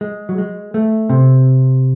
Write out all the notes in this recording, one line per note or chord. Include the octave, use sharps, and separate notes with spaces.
G#3
F#3
G#3
A3
C3